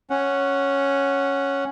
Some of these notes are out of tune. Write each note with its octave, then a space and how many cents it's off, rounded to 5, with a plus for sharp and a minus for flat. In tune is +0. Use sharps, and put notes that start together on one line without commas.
C#4 +0 F#5 +0